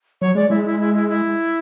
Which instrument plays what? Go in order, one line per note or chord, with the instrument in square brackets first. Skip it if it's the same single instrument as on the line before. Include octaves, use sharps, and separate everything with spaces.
[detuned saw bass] F#3 [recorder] C#5
[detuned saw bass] G#3 [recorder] D5
[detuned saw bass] G#3 [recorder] E4
[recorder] E4
E4
E4
E4